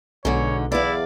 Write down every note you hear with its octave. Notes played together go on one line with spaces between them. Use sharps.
B1 G#2 D3 C#5
E2 E4 D5 F5